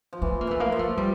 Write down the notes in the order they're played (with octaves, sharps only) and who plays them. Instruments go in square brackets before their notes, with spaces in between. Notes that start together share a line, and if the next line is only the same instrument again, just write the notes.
[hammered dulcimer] F3
[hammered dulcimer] E3 [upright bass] B3
[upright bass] A#3
[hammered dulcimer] E3 [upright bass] A3
[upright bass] A#3
[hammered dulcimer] F3
[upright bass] A3
[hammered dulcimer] F3 [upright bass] G3